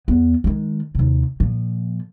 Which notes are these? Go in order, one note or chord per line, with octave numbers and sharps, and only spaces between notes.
E2 B3
D#3 G#3
D#2 C3
A#2 F3